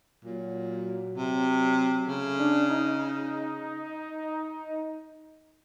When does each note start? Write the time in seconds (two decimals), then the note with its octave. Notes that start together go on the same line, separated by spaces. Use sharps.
0.25 A#2 F#3
1.17 C3
2.08 C#3 A3
2.39 D4
2.69 D#4